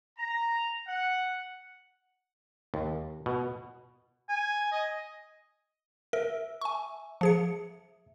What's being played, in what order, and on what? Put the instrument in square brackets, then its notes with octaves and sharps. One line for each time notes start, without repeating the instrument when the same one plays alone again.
[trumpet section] A#5
F#5
[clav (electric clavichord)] D#2
B2
[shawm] G#5
D#5
[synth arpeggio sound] A#4 [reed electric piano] E5
[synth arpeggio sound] G#5 C#6
F3 G#4 C#7